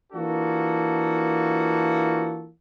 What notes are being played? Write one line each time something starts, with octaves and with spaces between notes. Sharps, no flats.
E3 A#3 D4 F4 F#4 A4